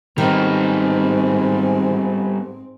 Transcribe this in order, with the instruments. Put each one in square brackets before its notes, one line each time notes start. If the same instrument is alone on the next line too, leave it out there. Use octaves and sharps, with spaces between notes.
[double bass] G#2 C4 [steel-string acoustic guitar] D#3 [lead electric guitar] G3 B3